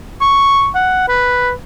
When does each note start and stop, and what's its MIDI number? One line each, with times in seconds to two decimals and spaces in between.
0.21 0.69 85
0.75 1.07 78
1.08 1.51 71